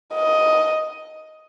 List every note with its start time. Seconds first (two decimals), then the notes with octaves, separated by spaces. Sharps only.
0.14 D#5